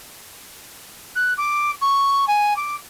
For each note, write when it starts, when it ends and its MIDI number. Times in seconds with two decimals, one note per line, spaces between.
1.15 1.33 90
1.37 1.71 86
1.81 2.25 85
2.27 2.56 80
2.56 2.76 86